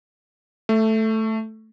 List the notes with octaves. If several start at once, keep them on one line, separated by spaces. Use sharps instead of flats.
A3